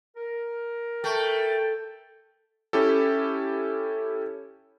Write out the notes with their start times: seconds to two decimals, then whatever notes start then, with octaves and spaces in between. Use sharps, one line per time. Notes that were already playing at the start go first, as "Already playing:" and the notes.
0.17 A#4
1.04 A3 G5
2.73 C#4 E4 G4 A4